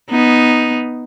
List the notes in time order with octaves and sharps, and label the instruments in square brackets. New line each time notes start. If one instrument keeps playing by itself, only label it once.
[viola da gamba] B3 D#4